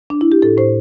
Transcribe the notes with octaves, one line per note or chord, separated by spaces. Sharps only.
D4
E4
G4
A2 A4
A2 C5